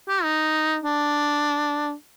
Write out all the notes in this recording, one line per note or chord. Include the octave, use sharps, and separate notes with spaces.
G4
D#4
D4